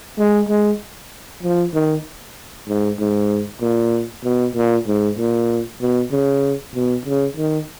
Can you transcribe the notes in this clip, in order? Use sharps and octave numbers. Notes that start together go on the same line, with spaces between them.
G#3
G#3
F3
D#3
G#2
G#2
A#2
B2
A#2
G#2
A#2
B2
C#3
B2
C#3
D#3